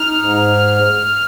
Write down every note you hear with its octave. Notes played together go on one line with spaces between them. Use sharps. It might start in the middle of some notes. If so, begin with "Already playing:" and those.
Already playing: D#4 F6
G#2